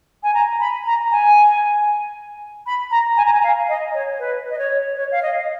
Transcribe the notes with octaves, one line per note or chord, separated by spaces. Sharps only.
G#5
A#5
B5
A#5
G#5
B5
A#5
G#5
A#5
G#5
F5
D#5
C#5
B4
D#5
C#5
C#5
F5
D#5